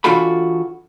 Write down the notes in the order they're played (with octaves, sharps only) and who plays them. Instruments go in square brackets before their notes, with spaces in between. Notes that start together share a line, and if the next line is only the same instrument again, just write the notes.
[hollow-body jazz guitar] E3 D4 F4 F#4 A4 B5